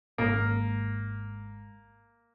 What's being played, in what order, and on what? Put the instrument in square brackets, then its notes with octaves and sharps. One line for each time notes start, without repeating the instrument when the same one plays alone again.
[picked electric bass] G#1 G#2 [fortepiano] A#3